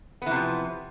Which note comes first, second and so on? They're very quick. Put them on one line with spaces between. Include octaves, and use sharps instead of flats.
B3 E3 C3 F3